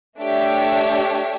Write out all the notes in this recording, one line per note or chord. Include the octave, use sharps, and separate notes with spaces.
A3 D4 G4 C#5 E5